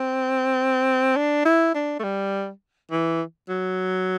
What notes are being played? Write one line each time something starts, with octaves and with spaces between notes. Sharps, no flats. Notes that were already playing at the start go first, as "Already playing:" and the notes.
Already playing: C4
D4
E4
D4
A3
G3
E3
F#3